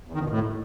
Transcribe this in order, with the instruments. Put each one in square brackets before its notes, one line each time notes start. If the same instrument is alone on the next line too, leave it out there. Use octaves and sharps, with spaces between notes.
[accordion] E2
D#3
F2
B2
A2